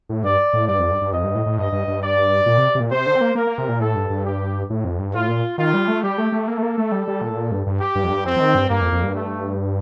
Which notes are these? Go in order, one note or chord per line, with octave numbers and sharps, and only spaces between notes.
A2
G2 D5
A2
G2 D5
F2
G2
G2
F2 D#5
G2
A2
A2
G2 D#5
G2
G2
D5
A#2
C3
C3
A#2
C3 C5
D3
C4
A#3
A#3 A#4
A#3
C3
A#2
A2 A4
G2
G2
G4
A2
F2
G2
A2 F4
A#2
D#3 F4
G3
A3
G3 G4
A3
A3
A#3 A4
A3
A#3
A3
G3
G3
A#2
A2
A#2
G2
G2
G4
G2
F2
G2
F2 C4
F3
D#3
G2
G2 A#3
F2
F2
G2
A3